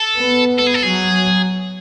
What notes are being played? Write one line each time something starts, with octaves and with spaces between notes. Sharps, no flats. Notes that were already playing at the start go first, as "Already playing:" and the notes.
Already playing: A4
B3
A4
G#4
A4
F#3 G#4